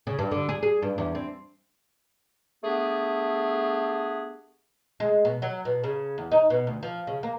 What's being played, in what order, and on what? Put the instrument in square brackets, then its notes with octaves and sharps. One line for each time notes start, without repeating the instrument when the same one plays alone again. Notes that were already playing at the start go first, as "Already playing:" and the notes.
[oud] C#3
G2
D3
G#4
G#4
G2
E2
C4
[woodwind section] A3 B3 D4 G4 G#4
[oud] G#3
B2
F#3
B2
C#3
E2
D#4
B2
D2
F3
C#3
A#3